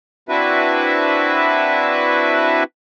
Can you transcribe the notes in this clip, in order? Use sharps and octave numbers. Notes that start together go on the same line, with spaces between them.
C4 D4 E4 F#4 B4 E5